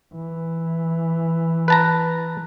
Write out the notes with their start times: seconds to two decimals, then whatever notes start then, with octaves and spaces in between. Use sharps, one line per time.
0.15 E3
1.68 B4 A5 A#5